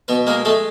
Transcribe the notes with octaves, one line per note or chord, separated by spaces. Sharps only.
B2 B3 B4
G#3 A#3 A#4
G#3 A3 A4